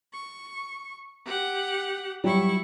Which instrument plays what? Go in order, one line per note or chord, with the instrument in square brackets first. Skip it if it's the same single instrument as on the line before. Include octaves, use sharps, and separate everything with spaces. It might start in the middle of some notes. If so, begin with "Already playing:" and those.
[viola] C#6
G4 F#5
[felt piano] F#3 G3 C#5 [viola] E4 C#6